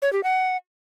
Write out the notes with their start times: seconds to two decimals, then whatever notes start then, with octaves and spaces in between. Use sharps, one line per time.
0.02 C#5
0.13 G4
0.23 F#5